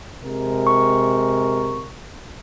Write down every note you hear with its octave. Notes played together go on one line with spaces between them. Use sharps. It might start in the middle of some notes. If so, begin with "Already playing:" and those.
C3 G#3 A#4
C#6